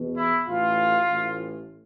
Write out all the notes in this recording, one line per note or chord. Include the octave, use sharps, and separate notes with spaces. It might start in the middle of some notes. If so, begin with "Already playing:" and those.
Already playing: E2 B2
E4
A1 A2 E3 F4
A1 A2 E3